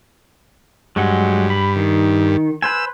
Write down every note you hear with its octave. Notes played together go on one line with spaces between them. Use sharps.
G2 F#3 G#3 F#5
B5
D#3
B4 C5 G#5 E6